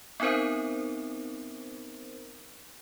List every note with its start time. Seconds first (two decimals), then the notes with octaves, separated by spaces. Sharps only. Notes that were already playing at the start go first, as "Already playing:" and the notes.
0.20 B3 C4 D#4 A#4 C5